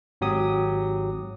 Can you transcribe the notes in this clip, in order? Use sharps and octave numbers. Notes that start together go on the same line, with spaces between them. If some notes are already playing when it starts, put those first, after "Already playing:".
G#1 F#3 G4 D#6